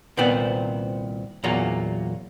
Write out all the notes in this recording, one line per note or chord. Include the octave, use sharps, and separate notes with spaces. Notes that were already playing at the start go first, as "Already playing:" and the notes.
C2 A#2 D#3 B3 C4 D5
E2 A#2 F#3 A#3 A#5